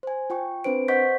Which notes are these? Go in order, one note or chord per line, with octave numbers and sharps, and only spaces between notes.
C5 G#5
F4 G5 C#6
C4 D4 B4 C5 D7
C5 D#5 F#5 C#6 G6 B6